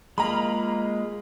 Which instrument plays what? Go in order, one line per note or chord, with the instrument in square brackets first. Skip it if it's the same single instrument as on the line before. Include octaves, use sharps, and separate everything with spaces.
[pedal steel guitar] G#3 A#3 F4 [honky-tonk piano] A#5 B5